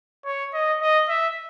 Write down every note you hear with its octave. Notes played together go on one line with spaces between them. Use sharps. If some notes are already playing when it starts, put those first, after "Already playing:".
C#5
D#5
D#5
E5